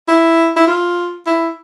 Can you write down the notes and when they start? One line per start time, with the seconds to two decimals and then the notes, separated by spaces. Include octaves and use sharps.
0.08 E4
0.56 E4
0.67 F4
1.27 E4